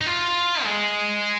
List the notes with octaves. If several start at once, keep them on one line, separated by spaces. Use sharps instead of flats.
D#4
F4
G#3